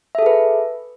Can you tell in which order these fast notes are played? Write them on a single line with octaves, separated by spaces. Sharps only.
E5 A4 G#4 B4